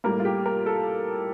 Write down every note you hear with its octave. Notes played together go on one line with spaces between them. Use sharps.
A2 G3 A#3 A#4
F4
G4
A#4
A4